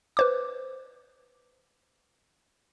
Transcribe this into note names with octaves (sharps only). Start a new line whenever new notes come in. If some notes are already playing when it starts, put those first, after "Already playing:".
B4 C5 D6